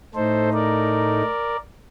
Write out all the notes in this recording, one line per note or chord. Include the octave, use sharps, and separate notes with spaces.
A2 A3 D#4 A4 C5
A#4 D5